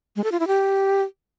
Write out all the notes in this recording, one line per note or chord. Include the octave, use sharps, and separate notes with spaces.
G#3
A4
F4
E4
G4